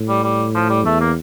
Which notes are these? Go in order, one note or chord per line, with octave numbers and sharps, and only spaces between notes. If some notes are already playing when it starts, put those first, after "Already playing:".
Already playing: A2
G3
G3
F3
G3
E2 A3
A#3